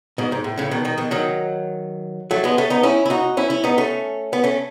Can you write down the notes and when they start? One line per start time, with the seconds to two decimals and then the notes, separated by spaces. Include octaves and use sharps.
0.18 G#2 B2
0.32 G#2
0.44 A2
0.57 A2 C#3
0.71 B2 D#3
0.85 B2 D#3
0.98 B2 D#3
1.11 D#3 F#3
2.31 F#3 A3
2.44 G#3 B3
2.58 A3 C#4
2.70 B3 D#4
2.83 C#4 E4
3.05 E4
3.10 D#4 F#4
3.37 C#4 E4
3.50 C#4 E4
3.64 B3 D#4
3.78 A3 C#4
4.33 B3
4.44 A3 C#4